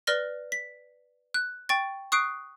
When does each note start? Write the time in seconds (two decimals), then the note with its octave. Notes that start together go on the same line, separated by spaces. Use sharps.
0.07 B4 D5 F6 A#6 G7
0.52 B6
1.34 F#6
1.69 G5 C#6 A6
2.12 C#6 D#6 F#6 C7 D7